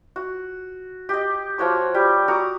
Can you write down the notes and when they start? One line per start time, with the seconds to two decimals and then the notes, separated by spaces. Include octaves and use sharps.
0.16 F#4
1.09 G4 D#5
1.58 F3 F#4 C#5 D6
1.94 G3 G4
2.28 F#4 A#5 D6 D#6